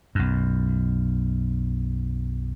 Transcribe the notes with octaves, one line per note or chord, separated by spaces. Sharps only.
B1 F#2